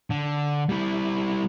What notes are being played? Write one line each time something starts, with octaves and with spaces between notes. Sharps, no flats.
D3
G3 E4